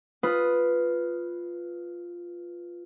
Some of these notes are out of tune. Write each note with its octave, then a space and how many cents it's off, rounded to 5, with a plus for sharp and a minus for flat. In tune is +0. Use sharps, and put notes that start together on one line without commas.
F4 +0 B4 +0 D#6 +0